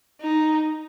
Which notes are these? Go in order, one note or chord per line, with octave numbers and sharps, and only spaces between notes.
D#4